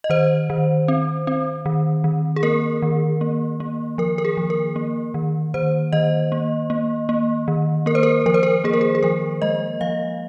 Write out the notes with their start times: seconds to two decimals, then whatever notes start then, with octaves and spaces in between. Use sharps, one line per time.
0.04 D#5
0.10 D#3 C5
0.50 D#3
0.88 C4
1.27 C4
1.66 D#3
2.04 D#3
2.36 G#4
2.43 A#3 A#4
2.82 D#3
3.21 A#3
3.60 A#3
3.98 F3 A#4
4.18 A#4
4.25 G#4
4.37 F3
4.50 A#4
4.76 A#3
5.14 D#3
5.54 D#3 C5
5.93 D#3 D#5
6.32 A#3
6.70 A#3
7.09 A#3
7.48 D#3
7.86 A#3 A#4
7.95 C5
8.03 A#4
8.26 F3 A#4
8.34 C5
8.43 A#4
8.64 A#3 G#4
8.73 A#4
8.81 G#4
8.95 G#4
9.03 F3 A#4
9.42 G#3 D#5
9.81 F3 F5